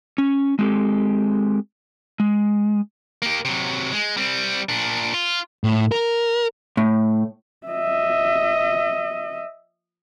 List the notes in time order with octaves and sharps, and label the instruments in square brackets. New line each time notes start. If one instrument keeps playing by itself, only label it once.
[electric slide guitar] C#4
G#3 C4 D#4 G4 A4
G#3
[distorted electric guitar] A#3 G4
C3 F#3
G#3
G3 C4
A#2 D4
F4
[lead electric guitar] A2
A#4
[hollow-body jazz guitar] A2
[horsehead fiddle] D#5 E5